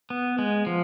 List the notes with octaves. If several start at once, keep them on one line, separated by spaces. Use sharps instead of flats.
B3
G#3
F3